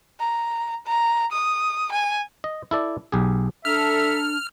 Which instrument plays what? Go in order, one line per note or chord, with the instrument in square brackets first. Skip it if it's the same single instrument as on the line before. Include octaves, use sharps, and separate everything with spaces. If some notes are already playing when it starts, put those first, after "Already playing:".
[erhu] A#5
A#5
D#6
G#5
[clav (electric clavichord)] D#5
E4 A4 D5
B1 G4 G#4
[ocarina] D4 [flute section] A4 A#5 [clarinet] E5 [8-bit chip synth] F6